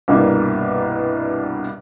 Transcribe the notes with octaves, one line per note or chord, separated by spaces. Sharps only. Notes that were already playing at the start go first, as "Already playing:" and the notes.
C2 G2 B2 G3 A#3